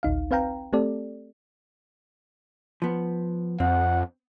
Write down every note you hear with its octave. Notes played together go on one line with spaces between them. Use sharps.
A1 D2 D#4 F5
C4 B4 F5 G5 A#5
A3 C4 G4 A4 D5
F3 B3
F2 C4 F#5